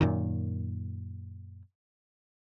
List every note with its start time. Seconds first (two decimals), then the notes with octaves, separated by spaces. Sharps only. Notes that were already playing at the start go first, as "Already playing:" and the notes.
0.01 F#2 A#2 D#3